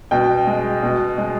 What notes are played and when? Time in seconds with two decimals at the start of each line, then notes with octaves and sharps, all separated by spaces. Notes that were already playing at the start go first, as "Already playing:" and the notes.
0.11 B2 G5
0.47 G#3
0.83 B2
1.18 G#3